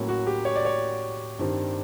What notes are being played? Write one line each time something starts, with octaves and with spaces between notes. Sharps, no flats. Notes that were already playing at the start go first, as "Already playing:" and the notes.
Already playing: A2 F#3 A#3 C#4
F#4
G4
C#5
D5
C#5
G2 D#3 G3 C4